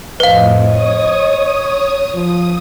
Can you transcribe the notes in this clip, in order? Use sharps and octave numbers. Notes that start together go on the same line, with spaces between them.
F2 A2 B4 C5 D#5 F5
C#5 D#6
F3 D#6